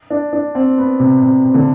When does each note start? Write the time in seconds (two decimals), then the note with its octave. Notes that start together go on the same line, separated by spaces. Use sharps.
0.10 D4
0.33 D4
0.55 C4
0.78 B3
1.00 C3
1.22 C3
1.45 C3
1.54 D3